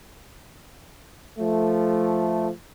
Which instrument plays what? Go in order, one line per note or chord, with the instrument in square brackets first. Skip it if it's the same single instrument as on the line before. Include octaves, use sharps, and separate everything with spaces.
[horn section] F3 A3